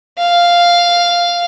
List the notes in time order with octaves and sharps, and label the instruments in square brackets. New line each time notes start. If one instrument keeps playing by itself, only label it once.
[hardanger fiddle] F5